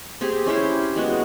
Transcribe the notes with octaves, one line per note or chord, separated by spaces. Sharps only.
C4 G4 G#4
C#4 E4 G4 C5
G#3 B3 F#4